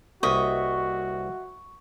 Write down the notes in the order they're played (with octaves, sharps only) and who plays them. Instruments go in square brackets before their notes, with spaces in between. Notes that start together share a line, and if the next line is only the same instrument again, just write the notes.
[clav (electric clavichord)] C2 A#3 B4 [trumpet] F#4 [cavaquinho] D#5 E5 [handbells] C#6